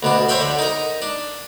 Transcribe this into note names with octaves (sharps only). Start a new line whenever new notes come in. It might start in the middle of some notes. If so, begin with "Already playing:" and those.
D2 B2 D4
C5 C#5 E5 G5 B5 C6
D3
D#4 A#4
D4